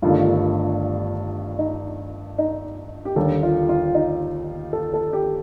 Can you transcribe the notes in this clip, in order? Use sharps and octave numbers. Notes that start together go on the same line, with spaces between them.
G1 G2 D#3 A3 F4
D#4
D#4
G4
D#2 D3 G3 A4
F4
F4
D#4
A4
A4
G4